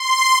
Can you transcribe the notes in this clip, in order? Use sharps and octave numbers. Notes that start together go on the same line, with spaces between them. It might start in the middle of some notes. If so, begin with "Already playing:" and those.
Already playing: C6